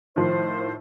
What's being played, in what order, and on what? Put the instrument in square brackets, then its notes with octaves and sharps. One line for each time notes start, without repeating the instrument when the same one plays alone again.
[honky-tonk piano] A2 D#3 F3 [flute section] C5